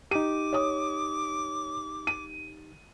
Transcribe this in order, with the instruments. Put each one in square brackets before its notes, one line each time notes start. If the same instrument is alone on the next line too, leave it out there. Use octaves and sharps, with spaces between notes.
[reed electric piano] D#4 G4 [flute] D6 [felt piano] D#7
[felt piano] C#5 D#6
D#7